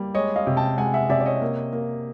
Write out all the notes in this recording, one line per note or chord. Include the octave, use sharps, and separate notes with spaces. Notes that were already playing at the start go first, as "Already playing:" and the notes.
Already playing: G3 A#3
G#3 C#5 D#5
D#5 F5
C3
G5 A5
G#3 F#5 G#5
E5 F#5
C3 D5 E5
D5
C#5 D#5
A#3
A#3